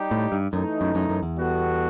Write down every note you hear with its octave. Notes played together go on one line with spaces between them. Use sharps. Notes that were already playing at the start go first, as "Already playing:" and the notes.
Already playing: G3 D#4 G4
A2
G2
F#2 E3 A3 D#4
F#2
F#2
F#2
E2
G3 B3 F#4 A4